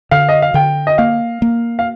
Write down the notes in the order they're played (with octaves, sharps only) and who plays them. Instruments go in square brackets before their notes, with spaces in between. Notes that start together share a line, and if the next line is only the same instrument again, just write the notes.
[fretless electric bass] D3 [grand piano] F5
[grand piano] D#5
F5
[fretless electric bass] D3 [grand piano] G5
[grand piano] D#5
[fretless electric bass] A#3 [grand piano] F5
[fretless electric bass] A#3
[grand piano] F5